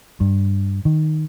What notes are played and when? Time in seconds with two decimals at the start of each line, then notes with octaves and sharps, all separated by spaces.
0.21 G2
0.85 D#3